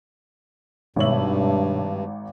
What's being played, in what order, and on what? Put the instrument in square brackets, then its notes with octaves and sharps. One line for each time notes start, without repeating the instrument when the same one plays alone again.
[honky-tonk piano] G#1 F#7 [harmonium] G2 [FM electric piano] B2 C#5 E5